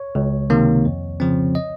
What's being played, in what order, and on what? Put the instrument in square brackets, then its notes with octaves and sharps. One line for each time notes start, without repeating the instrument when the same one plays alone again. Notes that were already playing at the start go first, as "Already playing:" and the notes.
Already playing: [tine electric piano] C#5
C#2
C3 D#3 A#3
F2
C#3 F3 C4
D#5